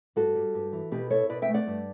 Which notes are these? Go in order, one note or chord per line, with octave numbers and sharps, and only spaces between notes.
G2 F#4 A4
G3
G2
E3
B2 G4 B4
E4 A4 C#5
B2 B4 D5
E5 G5
A3
D5 F#5
G2